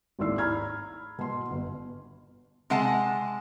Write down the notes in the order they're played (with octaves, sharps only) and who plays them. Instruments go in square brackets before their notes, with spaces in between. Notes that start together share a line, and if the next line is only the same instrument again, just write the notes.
[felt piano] G#1 D#2 A2 D5 E6 C7
A#5 B5 F6 G#6
B2 C6
G1
[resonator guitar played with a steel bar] C3 G#3 F#5 A5